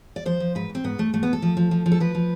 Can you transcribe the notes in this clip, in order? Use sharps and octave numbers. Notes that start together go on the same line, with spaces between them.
D5
F3 C5
F3
G#2 B4
G#2
C4
G#2 B3
G#2 A3
G#2 A3
B3
G#2
A4
F3
F3
F3
F3
A4
F3 B4
F3